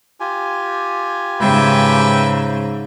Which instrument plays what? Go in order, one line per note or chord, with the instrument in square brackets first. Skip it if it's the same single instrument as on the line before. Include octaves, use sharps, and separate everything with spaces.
[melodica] F4 G4 G#5
[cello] G#2 C#3 [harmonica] B4 E5 G5